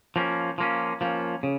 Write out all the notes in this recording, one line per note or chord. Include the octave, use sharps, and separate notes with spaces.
F3 A#3 C#4
F3 A#3 C#4
F3 A#3 C#4
C#3